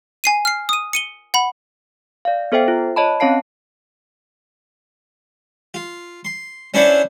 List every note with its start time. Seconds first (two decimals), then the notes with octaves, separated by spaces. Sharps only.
0.24 G#5 C7 D#7
0.45 F6 C7
0.69 D#6 D#7
0.93 C#7 D#7 G7
1.34 F#5 B5
2.25 D5 F5
2.52 B3 A4 C5 E5 G5
2.68 F4
2.96 C#5 D#5 A5 B5
3.20 C4 C#4 C#5 F5 A5 C7
5.74 F4
6.25 C6
6.74 C#4 D4 E4 C5 D5 F#5